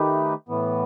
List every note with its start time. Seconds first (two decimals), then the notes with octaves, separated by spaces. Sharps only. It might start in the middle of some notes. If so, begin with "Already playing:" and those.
Already playing: D#3 A3 D#4 G4 B4
0.49 A2 E3 B3